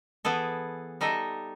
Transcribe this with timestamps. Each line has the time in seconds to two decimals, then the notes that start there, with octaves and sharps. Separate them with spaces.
0.25 E3 B3 G#4 A4
1.01 G3 D#4 A4 D#5 E5